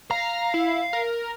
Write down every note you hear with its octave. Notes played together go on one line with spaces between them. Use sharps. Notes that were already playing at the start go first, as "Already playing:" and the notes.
F5 A#5
E4
A#4